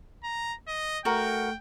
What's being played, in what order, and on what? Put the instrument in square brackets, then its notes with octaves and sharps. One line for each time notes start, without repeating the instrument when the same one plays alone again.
[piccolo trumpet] A#5
D#5
[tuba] A3 [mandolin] F#4 A#4 [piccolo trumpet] G5